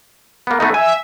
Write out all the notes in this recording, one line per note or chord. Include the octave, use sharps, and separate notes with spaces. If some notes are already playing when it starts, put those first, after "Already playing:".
A#3 B3
A3 B3 D#4
E5 G#5